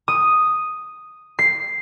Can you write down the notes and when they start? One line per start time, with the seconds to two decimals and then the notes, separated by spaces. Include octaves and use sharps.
0.08 D#6
1.39 C7